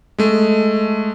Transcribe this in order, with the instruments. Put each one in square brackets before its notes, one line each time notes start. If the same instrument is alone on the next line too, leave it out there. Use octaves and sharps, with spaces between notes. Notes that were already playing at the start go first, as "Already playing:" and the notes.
[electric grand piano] G#3 A3